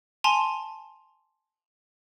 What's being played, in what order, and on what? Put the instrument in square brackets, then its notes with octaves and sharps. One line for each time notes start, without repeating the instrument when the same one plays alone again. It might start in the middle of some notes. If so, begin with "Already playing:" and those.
[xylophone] G#5 A5 C6 F7